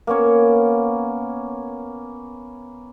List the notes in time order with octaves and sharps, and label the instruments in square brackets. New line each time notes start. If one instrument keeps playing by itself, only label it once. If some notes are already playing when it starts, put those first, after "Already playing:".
[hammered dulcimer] A#3 B3 C#4 C#5